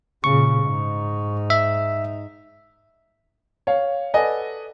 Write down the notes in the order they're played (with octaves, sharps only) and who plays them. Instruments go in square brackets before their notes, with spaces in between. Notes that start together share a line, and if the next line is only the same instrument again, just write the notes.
[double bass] A#2 C#3 [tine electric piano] C#6
[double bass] G#2 D#4
[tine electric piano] E5
[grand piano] C#5 F5
A4 B4 D5 D#5 F#5 G#5